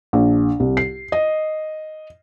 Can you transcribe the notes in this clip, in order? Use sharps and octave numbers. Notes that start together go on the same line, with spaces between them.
A#1
C2
C7
D#5